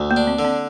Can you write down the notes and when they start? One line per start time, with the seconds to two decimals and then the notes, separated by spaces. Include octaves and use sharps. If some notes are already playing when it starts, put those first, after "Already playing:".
Already playing: D2
0.11 A#3
0.16 D4
0.27 C4
0.39 D3
0.44 C4